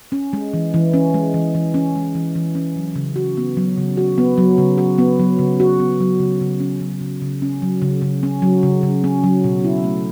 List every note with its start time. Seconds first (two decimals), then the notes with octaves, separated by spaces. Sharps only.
0.12 C#4
0.33 G#3
0.54 E3
0.74 E3
0.94 C#4
1.14 G#3
1.34 E3
1.55 E3
1.74 C#4
1.95 G#3
2.15 E3
2.35 E3
2.55 C#4
2.76 F#3
2.95 C#3
3.16 F#4
3.37 B3
3.57 F#3
3.78 C#3
3.97 F#4
4.18 B3
4.38 F#3
4.58 C#3
4.78 F#4
4.98 B3
5.19 F#3
5.39 C#3
5.60 F#4
5.80 B3
6.00 F#3
6.19 C#3
6.41 C#3
6.60 C#4
6.80 F#3
7.01 C#3
7.22 C#3
7.42 C#4
7.62 F#3
7.82 C#3
8.02 C#3
8.23 C#4
8.42 F#3
8.63 C#3
8.83 C#3
9.04 C#4
9.24 F#3
9.44 B2
9.64 E4
9.84 A3